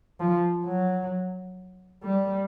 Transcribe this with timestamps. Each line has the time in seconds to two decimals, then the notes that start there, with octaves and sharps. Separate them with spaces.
0.20 F3
0.65 F#3
2.03 G3